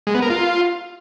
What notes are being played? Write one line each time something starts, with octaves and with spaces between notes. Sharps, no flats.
G#3
B3
A#4
F4